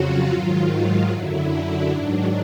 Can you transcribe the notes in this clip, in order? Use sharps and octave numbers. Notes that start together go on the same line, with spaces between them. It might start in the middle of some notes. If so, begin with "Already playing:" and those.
Already playing: F2 C#3 F#3 F4 F#4
G#2 D#3 F#3
F4
F#2 D3 F#3 E4
D4
G#2 D#3 F#3